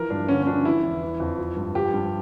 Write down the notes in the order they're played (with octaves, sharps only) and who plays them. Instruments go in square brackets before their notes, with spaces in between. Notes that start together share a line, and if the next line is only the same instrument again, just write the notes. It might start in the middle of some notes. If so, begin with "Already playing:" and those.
Already playing: [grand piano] E3 F3 A#4
G2 D4
D3 C#4
C#4
F3 D4
E3 E4
E2
E3
F2
F3
G2
F3 G4
G2